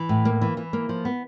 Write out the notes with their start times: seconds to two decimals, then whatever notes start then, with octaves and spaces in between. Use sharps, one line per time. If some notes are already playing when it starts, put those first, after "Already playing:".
Already playing: E3
0.09 A2
0.25 A#3
0.41 E3
0.57 E3
0.73 A#3
0.89 F3
1.05 B3